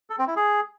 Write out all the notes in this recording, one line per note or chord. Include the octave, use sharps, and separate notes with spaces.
A4
C4
E4
G#4